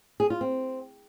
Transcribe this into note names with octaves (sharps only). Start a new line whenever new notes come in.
G#4
F4
C4